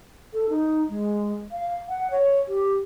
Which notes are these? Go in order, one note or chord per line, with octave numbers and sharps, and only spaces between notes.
A4
D#4
G#3
F5
F#5
C#5
G4